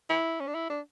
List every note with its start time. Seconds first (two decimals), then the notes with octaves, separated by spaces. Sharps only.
0.10 E4
0.40 C#4
0.47 D4
0.55 E4
0.70 D4